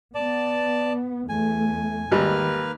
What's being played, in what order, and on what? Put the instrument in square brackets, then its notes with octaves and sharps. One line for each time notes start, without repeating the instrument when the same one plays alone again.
[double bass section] B3 [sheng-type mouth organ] D5 A5
[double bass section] E2 A3 [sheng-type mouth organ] G#5
[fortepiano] G#1 G3 [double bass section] D#3 [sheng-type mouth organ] A#3 B4 F6